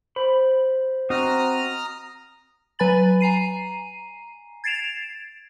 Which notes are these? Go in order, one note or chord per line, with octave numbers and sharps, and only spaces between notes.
C5 B5
C4 F#4 D#5 A#5 D#6 F6
F#3 B4 G#5 B5 A6 F#7
G#5 A#5 C7 D#7
G#6 A6 C7 D7 E7 F7